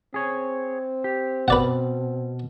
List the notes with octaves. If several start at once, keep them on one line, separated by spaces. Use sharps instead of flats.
C4 G#4 C#5
G4
B2 B4 D5 F#5